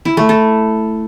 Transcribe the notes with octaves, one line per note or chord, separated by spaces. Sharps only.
E4
A3
A4